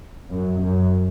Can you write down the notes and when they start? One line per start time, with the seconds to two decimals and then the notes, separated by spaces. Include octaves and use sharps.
0.30 F#2
0.62 F#2